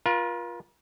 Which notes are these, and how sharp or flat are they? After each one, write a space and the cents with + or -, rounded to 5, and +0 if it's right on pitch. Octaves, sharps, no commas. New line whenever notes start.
F4 +0 A#4 +45